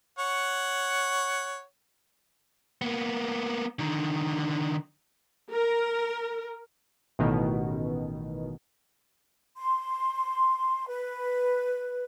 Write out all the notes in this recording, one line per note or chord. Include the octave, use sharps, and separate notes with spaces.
C#5 F#5
A#3 B3
D3 D#3
A#4
A1 B2 D#3
C6
B4